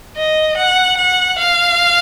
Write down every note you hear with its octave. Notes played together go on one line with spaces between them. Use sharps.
D#5
F#5
F#5
F5